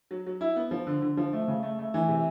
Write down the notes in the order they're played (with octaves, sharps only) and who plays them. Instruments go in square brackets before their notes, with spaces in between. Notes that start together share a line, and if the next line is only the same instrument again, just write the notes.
[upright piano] F#3
F#3
E4
B3
F3
D3
D3
F3
A3
C#3
A3
A3
E3
C3